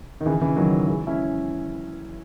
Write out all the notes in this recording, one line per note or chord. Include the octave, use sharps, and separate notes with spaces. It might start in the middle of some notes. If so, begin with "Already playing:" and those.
D#3
C#3 E3
C#3 E3
D#3 F#3
E3 G#3
C#4 E4